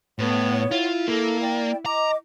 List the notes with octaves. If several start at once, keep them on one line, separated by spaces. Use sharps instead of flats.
A2 B3 C#5 F#5
E4 F4
A#3 A4
D5 G5
D#5 A#5 D6